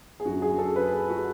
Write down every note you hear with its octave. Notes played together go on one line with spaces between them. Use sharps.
G#4
F#2 D3 F#4
G#4
A4
B4
G#4
F#4